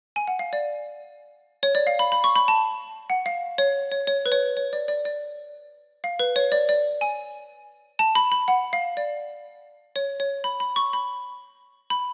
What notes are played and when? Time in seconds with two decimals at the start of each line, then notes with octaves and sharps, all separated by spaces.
0.16 G#5
0.28 F#5
0.39 F5
0.53 D5
1.63 C#5
1.75 D5
1.87 F5
1.99 B5
2.12 B5
2.24 C#6
2.36 B5
2.48 A5
3.10 F#5
3.26 F5
3.58 C#5
3.92 C#5
4.07 C#5
4.26 B4
4.32 C#5
4.57 C#5
4.73 D5
4.88 D5
5.05 D5
6.04 F5
6.19 B4
6.36 C#5
6.52 D5
6.69 D5
7.01 G#5
7.99 A5
8.15 B5
8.32 B5
8.48 F#5
8.73 F5
8.97 D5
9.96 C#5
10.20 C#5
10.44 B5
10.60 B5
10.76 C#6
10.93 B5
11.90 B5